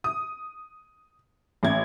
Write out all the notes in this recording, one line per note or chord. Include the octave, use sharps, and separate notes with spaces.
D#6
A1 G#6